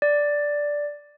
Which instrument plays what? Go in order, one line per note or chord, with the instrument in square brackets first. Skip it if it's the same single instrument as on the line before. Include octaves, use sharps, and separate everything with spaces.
[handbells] D5